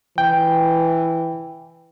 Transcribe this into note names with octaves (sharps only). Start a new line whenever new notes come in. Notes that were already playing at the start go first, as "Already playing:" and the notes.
E3 G5